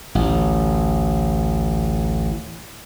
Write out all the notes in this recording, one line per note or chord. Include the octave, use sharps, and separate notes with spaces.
A1 D2